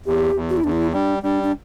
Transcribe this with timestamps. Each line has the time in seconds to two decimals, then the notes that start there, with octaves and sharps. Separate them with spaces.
0.06 E2 G4
0.35 E2
0.50 F#4
0.57 E4
0.64 E2 D4
0.71 E4
0.93 G3 D4
1.23 G3 D4
1.43 D4